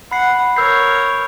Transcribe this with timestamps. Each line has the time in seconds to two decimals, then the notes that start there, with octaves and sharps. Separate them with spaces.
0.11 F#5 B5 C7
0.56 A#4 C#5 E6 G6 C7